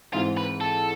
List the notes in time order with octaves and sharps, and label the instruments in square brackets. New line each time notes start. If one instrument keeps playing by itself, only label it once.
[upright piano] G#2 E3 G#3 C4 E4 [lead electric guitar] F4
[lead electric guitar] B4
A4